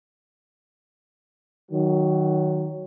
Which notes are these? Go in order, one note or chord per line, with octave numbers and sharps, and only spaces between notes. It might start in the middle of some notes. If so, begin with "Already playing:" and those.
D#3 F#3